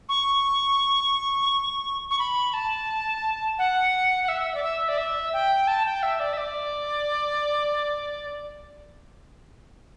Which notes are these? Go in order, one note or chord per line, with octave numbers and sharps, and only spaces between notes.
C#6
C#6
B5
A5
F#5
F#5
E5
D5
E5
D5
E5
G5
A5
G5
E5
D5
E5
D5